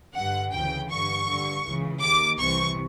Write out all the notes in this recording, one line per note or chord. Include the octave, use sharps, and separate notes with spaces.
G2 D3 F#5
D2 C#3 E3 G5
G2 D3 C#6
G2 D3
C#2 C#3 E3
D#2 D#3 D6
C2 C3 E3 C#6